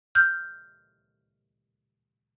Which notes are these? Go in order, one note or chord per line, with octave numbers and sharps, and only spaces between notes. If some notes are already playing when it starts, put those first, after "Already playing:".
F6 G6